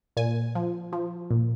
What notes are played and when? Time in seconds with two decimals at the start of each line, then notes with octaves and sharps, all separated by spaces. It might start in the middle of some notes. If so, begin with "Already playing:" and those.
0.17 A#2 G#5
0.55 F3
0.93 F3
1.30 A#2